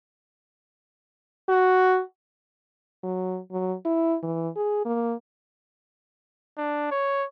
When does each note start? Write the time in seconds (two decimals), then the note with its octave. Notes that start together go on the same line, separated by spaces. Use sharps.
1.49 F#4
3.03 F#3
3.51 F#3
3.85 E4
4.23 E3
4.56 G#4
4.85 A#3
6.58 D4
6.92 C#5